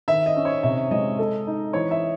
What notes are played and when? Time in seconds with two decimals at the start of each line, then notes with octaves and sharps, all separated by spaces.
0.08 D#3 E5
0.26 D#5
0.36 C#4
0.45 C#5
0.63 C3 E5
0.91 G#3 D#5
1.19 A4
1.47 D#4
1.73 E3 C#5
1.91 E5